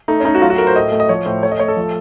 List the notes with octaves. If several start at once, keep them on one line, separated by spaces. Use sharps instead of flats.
A3 D#4
C#4
A3 D#4
F#4
F#3 F4
F#4
A3 A#4
C5
A2 D#5
A3
D#5
F3 C#5
A2 C5
A3 C#5
D#5
A3 C#5
A4
F3